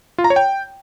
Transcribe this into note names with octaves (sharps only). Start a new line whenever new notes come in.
F4
A#5
C#5
G5